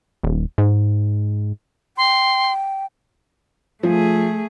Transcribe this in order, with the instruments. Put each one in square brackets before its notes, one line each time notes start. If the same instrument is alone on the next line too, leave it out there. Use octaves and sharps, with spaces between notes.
[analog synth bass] D#1
G#2
[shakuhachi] G5 [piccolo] C6
[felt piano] F3 [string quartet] A3 G#4